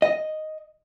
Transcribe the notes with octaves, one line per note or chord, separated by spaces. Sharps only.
D#5